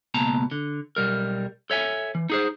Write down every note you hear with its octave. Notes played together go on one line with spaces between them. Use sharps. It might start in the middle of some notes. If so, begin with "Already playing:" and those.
C#2 B2 A#3 A5 A#5
D3
B1 G3 A#4
A4 C#5 E5 G#5
E3
D#4 G#4 C5